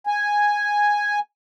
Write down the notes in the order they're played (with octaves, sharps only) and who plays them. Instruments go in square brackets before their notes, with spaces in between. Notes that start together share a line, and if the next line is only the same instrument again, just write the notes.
[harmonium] G#5